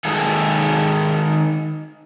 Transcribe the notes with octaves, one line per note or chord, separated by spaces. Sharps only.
D#3 G#3 G#4 A4